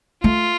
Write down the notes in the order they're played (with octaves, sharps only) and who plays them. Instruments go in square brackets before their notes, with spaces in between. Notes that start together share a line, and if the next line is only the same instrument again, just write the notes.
[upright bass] A3 [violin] F4